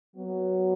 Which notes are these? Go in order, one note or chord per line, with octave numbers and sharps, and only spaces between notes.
F#3 B3 F#4